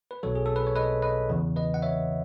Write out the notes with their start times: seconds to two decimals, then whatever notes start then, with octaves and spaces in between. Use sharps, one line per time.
0.11 B4
0.23 B1 B2 F#3 A4 C#5
0.35 G#4
0.46 A4
0.56 B4
0.67 C#5
0.76 B4 D#5
1.02 B4 D#5
1.29 E2 C#3 E3
1.56 B4 D#5
1.74 F#5
1.82 C#5 E5